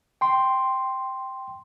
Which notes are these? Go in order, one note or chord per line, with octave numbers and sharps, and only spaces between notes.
G5 C6